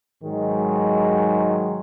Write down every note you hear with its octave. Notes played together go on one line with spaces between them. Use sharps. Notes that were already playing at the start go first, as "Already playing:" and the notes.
G#2 D#3 F#3 G#3